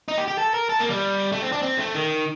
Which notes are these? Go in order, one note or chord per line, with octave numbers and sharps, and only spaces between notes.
D#4
G4
G4
A4
A#4
A4
A#3
G3
A3
C4
D4
C4
A3
D#3